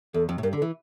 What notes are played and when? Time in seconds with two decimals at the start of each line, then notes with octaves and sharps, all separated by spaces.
0.14 E2 A4
0.29 F2
0.38 A2
0.43 G2 A#4
0.53 D3
0.57 A4
0.62 E3